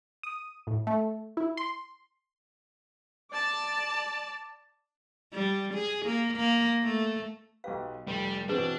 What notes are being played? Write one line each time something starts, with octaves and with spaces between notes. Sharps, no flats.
D#6
A2
A3
E4
C6
D5 A5
G3
G#4
A#3
A#3
A3
B1 G4 B4 F5
F1 G3
B2 E3 C4 D4 G#4 B4